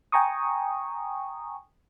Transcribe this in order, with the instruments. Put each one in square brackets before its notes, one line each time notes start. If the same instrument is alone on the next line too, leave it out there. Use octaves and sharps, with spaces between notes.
[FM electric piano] G5 G#5 A#5 C#6 D#6